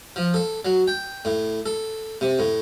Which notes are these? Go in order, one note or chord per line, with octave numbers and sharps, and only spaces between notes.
F3
A4
F#3
G5
A2
A4
C3
A2